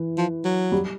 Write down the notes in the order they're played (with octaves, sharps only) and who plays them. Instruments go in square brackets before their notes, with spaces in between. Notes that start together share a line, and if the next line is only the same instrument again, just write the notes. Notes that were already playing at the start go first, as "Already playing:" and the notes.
Already playing: [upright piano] E3
[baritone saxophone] F3
F#3
[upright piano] G3